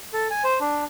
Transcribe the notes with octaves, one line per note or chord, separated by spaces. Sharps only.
A4
G#5
C5
D4